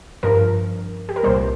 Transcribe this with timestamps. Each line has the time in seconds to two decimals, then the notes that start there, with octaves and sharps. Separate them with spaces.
0.23 G2 F3 A#4
1.09 G4
1.16 A#4
1.23 C2 A#2 G3 C5